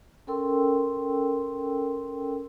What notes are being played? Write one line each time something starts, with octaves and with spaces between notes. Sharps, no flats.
C#4 A4 A#4 G5 C6 E6